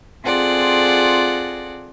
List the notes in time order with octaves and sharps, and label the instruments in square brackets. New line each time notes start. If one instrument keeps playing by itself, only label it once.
[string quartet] C4 F4 G#4 A4 D5 F#5